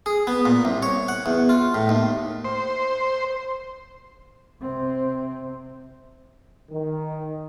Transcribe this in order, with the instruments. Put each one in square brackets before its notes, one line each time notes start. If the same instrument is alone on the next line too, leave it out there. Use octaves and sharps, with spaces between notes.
[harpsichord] G#4
B3
A#2
C2
C#5
F#5
E2
F4
A2
D#2
[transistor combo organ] C5
[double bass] C3 C4
[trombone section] D#3